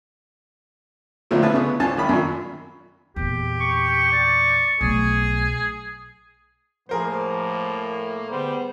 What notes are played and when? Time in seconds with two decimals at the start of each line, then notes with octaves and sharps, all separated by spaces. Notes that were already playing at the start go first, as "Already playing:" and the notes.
1.31 A#1 A#2 D3 F3 A3
1.42 A1 E4 B4 A5
1.54 C#3 B3
1.80 C2 C#4 F4 G#5 A5
1.97 A1 D#3 B5
2.09 F#2 A#2
3.16 E2 A#2 G4
3.61 C#6
4.12 D5
4.81 B1 A3 G#4
6.89 A2 F3 A3 A#3 G#4 A#4 C5
8.30 D3 G3 B3 G#4 C5